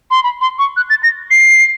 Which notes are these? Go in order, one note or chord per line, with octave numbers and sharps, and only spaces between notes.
C6
B5
C6
C#6
F#6
A6
A#6
C7